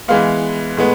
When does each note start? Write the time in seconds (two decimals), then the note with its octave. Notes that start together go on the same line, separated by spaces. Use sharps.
0.08 E3 G#3 B3 F5
0.77 A2 G#3 B3